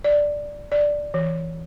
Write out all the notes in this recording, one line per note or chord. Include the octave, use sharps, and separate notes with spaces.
D5
D5
E3